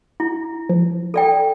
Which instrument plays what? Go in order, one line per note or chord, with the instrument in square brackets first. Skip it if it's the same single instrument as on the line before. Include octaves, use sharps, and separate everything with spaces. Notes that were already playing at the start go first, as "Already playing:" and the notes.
[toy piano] E4
[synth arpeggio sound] F3
[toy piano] A4 D5 G5